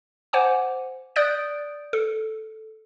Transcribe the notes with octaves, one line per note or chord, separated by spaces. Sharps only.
C5 F#5 G#5 D6
D5 D#6 F#6 G6 A6 D7
A4